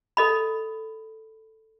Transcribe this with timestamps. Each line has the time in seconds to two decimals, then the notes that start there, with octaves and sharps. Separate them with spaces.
0.17 A4 D#5 B5